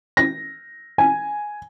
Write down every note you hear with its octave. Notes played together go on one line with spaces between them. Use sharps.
A#6
G#5